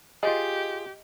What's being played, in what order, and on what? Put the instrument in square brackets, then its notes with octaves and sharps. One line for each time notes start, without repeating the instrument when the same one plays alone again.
[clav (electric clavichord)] F4 G#4 [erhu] G4 [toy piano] D#5